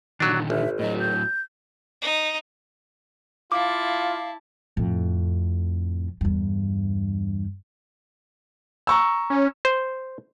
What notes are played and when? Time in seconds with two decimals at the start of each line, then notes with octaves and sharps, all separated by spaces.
0.20 A#2 D3 D#3 F#3 D4
0.50 G#1 E5
0.79 A2 F#3 D#5
1.00 G6
2.02 D#4
3.52 E4 F4 F5 A5 D6
4.77 F2 A2
6.21 E2 G2
8.87 A#5 C#6 E6
9.30 C#4
9.65 C5